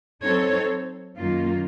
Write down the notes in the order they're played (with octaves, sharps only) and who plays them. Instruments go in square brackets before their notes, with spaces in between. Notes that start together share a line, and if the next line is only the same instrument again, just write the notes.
[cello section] F#3 C4 D#4 A4 C#5
F#2 D#3 A#3 F4